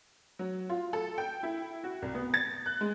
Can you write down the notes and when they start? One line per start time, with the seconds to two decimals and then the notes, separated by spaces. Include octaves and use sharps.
0.39 F#3
0.70 F4
0.93 A4
1.18 G5
1.43 E4
1.84 F#4
2.02 C2
2.14 B3
2.34 A6
2.66 F#6
2.81 G#3